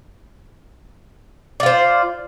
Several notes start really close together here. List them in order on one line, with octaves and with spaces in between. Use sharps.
D5 F4 C5